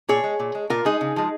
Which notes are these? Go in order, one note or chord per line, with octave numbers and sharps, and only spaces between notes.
A#2 G#4 C#5
G#3
A#2
G#3
A#2 F4 A#4
G#3 D#4 G#4
C#3
F3 G#3